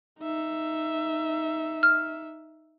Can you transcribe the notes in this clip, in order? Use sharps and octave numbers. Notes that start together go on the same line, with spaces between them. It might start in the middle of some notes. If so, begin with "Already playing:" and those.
D#4 E5
F6